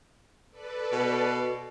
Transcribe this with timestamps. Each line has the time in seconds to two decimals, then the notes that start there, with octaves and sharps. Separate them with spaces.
0.51 A4 B4 D5
0.92 B2